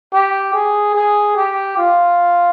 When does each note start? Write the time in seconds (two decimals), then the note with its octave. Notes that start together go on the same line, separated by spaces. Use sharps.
0.13 G4
0.54 G#4
0.95 G#4
1.37 G4
1.77 F4